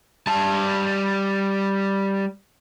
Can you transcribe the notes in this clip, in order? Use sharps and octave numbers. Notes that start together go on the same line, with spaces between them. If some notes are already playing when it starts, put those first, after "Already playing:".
G3 A5